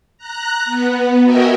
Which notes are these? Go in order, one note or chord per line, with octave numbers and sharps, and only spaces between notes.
A#5 F#6
B3
F#4 A#4 D#5 E5 G5 G#5